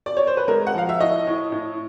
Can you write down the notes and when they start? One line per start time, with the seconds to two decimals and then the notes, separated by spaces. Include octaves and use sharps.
0.06 D5
0.17 C#5
0.27 C5
0.37 B4
0.48 G#3 A#4
0.67 F#5
0.74 F3 F5
0.89 E5
1.00 A2 D#5
1.27 A2
1.52 A2